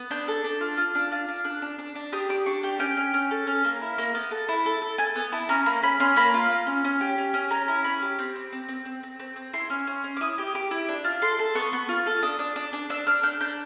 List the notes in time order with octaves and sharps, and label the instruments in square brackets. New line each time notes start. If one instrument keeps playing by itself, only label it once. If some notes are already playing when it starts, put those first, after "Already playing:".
Already playing: [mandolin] B3
D4 G6
A4
D4
F4
F4
D4
F4
D4
D4 F#6
D4
D4
D4
G4 D#6
D4 D6
D4 C#6
G4 G5
C#4 G5
C#4
C#4
A4
C#4
A#3
E4
A#3
B3
A4
E4
A4
A4
A4 G#5
B3
E4 A5
C#4 A#5
A#3 B5
C#4 B5
C#4 C6
A#3 B5
F4
A#3
C#4
C#4
G4
C#4
C#4
C#4 A#5
E4
C#4 B5
G4
C4
C4
C4
C4
C4
C4
C4
C4
E4 C6
C#4
C#4
C#4
D6
E4 D#6
G4
G4 D6
E4
D4
F4
A4 C6
A4
B3 C#6
B3
F4
A4
D4 D#6
D4
D4
D4
D4 E6
D4 F6
D4 G6
D4 G6